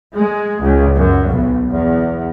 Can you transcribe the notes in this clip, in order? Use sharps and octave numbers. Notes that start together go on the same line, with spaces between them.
G#3
C#2
F#2
B1
E2